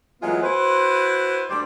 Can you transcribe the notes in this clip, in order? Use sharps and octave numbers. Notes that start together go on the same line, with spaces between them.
E3 F#3 G#3 A3 B3 F4
E4 F#4 B4 C5
D2 G3 C5 D5